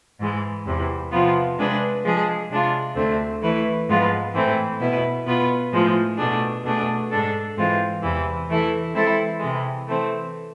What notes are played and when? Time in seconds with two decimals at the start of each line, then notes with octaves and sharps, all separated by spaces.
0.20 G#2 E3 G#3
0.65 E2 C3 E3
1.12 C3 F3 B3 F4
1.58 C3 G#3 D4 G#4 B4
2.04 F3 G#3 D4 G#4
2.50 C3 G#3 D4 F4
2.95 D2 D3 A3 C4
3.41 E3 A3 E4 B4
3.88 G#2 F3 G#3 B3 F4
4.34 A2 E3 A3 C4
4.80 B2 B3 E4 B4
5.27 B2 B3 F4 B4
5.72 A2 F3 G#3
6.18 B2 A3 D4 G#4
6.64 B2 A3 D4 G#4
7.10 G#2 G#3 D4 A4
7.56 G#2 E3 G#3 C4 F4
8.02 E2 C3 E3
8.48 E3 A3 E4
8.94 E3 G#3 C4 E4 A4
9.40 C3 E3 G#3
9.87 E3 A3 C4